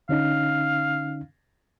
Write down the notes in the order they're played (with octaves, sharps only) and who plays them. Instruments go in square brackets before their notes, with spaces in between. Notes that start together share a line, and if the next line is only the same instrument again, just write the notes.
[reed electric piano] D3 C#4 D#4 [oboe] F5